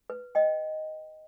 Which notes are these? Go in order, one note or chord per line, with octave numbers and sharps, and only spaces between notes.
B4
D#5 G5